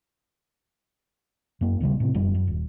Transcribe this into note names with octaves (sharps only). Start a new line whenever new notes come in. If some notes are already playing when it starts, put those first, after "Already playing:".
F#2 A#3
D#1 A#1 C#3 G3
A2 C3
F1 F#2 G3
F#2
D#1